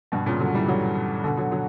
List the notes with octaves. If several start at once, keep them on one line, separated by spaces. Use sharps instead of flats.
G2 B2
A#2 C#3
D3 F#3
E3 G3
D3 F#3
B2 D3
D3 F#3
D3 F#3